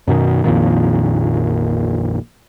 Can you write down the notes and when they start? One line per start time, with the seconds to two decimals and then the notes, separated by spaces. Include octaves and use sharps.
0.07 F#2 B2 D#3
0.44 A#1 F2 A#2 D#3